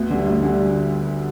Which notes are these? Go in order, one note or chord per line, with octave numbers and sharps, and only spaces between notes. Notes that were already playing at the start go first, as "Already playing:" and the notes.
Already playing: D2 B3
D3 G3
D2
D3 G3